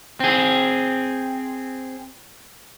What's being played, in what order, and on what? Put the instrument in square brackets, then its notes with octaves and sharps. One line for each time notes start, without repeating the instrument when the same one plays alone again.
[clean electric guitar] C4 G#4